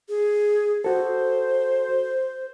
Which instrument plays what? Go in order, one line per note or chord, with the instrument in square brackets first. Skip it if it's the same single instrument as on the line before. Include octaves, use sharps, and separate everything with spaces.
[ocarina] G#4
[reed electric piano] F#4 A4 [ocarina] C5